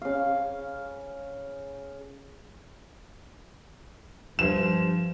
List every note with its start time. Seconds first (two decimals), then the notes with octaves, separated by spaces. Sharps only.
0.01 C#3 F5
4.39 G2 F3 E7